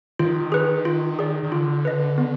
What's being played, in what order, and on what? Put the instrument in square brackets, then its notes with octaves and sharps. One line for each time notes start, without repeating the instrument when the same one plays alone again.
[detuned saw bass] D#3 [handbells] F4
[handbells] G#4 B4
F4
G#4 D5
[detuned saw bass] D#3
[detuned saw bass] D3 [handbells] F4
[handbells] B4 D#5
B3